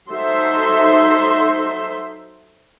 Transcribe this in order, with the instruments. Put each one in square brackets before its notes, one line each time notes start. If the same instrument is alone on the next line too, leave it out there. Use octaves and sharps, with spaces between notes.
[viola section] F#3 D#4 A4 C5 E5 C6